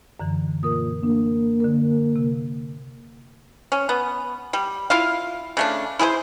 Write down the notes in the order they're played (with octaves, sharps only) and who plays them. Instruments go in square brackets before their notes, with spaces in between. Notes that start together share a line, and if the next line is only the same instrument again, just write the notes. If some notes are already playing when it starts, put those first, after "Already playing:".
[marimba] F#2 D3 E3
[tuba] A#2 [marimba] A#4 D#6
[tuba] A#3 [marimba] D4
[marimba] D3 A#4
C3
[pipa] C#4
B3
G3
E4 F4 F5
C#3 A3 D4
E4 G#4 B4 C5